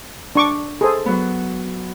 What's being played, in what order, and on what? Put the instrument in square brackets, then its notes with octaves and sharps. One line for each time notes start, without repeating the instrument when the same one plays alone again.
[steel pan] D4 C#6 D6
G#4 A4 C5
[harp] F#3 B3